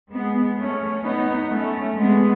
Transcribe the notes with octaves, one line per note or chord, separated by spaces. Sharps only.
G#3 B3
A3 C#4
B3 D#4
A3 C#4
G#3 B3